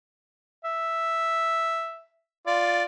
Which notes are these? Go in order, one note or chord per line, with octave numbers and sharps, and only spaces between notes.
E5
F4 D5